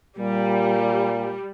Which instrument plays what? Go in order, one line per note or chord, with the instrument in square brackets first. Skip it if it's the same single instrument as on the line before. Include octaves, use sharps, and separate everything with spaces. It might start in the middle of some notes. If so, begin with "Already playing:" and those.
[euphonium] A#2 [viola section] G3